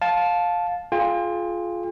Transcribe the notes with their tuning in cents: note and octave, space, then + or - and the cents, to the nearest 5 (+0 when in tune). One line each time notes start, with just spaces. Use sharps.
F5 +15 A5 -10
F4 +0 G#4 +30 G5 +45